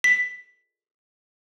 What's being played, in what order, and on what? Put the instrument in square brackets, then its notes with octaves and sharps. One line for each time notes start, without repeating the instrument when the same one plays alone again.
[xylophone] B6